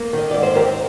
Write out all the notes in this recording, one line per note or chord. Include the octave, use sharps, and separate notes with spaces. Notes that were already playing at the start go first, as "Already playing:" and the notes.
Already playing: A#3
D#3 D#5
G#2 D5
C5
C4 G4 A#4